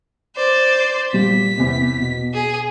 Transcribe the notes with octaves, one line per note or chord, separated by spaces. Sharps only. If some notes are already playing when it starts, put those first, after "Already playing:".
C5 D5
A#2 G3 A#3 B6
E2 C3
B2
G#4